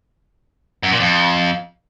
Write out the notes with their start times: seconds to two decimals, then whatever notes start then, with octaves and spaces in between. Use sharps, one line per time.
0.83 F#2
0.92 A#2
1.00 F2